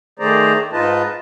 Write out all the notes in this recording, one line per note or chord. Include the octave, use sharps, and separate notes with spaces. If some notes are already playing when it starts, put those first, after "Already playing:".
D#3 A3 G#4 C5 D5 A#5
G#2 D#4 F4 B4 D#5 A5